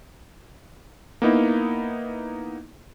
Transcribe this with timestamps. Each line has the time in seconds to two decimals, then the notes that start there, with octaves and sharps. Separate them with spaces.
1.22 A#3 B3 D#4 E4